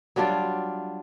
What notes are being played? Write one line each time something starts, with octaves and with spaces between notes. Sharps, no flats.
F#3 G3 D4 F4